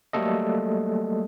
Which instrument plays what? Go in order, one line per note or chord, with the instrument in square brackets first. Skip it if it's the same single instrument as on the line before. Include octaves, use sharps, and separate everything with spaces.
[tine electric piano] F#3 G3 A3 A#3 A4 D#5